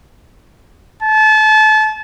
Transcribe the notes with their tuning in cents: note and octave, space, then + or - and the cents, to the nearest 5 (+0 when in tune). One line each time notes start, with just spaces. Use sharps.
A5 -30